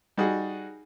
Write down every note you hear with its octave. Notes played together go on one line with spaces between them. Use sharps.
G3 D#4 F#4 G#4